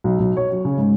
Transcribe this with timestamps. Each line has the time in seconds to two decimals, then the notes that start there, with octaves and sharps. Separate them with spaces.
0.04 B1
0.20 B1
0.37 C#5
0.52 F#3
0.65 C#3
0.78 G#2